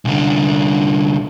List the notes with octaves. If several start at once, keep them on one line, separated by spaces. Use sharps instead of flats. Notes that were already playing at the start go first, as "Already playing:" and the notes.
C2 D3